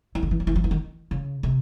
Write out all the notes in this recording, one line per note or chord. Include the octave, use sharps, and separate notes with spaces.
E3
D3
E3
F3
E3
F3
E3
D#3
C#3
C3